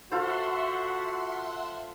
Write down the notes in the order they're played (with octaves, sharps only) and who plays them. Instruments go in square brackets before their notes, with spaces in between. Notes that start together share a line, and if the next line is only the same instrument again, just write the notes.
[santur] F4 A4 C5 [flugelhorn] F#4 [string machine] E5 F#5 C6